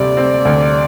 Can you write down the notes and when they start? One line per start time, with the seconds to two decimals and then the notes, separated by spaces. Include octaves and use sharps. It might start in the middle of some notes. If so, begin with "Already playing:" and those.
Already playing: D2 C3 G3 D5
0.17 C4
0.45 D2